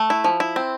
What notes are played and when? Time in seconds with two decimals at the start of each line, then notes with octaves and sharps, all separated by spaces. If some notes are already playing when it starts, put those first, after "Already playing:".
Already playing: A3
0.10 E4
0.24 F3
0.40 E4
0.56 C4